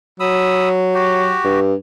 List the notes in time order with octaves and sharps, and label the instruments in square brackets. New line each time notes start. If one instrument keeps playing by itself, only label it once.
[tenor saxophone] F#3 [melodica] B5 D#6 E6
[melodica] F#4 G4
[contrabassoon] G2